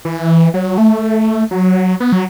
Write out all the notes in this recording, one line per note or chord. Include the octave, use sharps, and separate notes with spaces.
E3
F#3
A3
F#3
B3
F#3